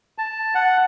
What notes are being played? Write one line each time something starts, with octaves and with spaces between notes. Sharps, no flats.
A5
F#5